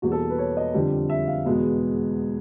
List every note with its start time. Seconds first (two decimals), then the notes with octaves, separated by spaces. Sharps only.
0.02 E2 B2 G3 A#3 F#4
0.12 A4
0.30 B4
0.38 C#5
0.57 D#5
0.74 F2 D3 G3
1.09 E5
1.27 F5
1.45 E2 B2 G#3 B3